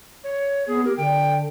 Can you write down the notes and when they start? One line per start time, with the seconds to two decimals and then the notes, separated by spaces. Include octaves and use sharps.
0.24 C#5
0.67 B3 G#4
0.85 G4 A#4
0.97 D3 G5